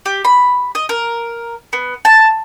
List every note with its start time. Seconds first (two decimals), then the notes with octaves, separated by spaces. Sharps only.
0.06 G4
0.25 B5
0.75 D#5
0.89 A#4
1.73 B3
2.05 A5